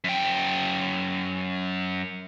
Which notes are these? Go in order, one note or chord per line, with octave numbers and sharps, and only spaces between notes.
F#2 G5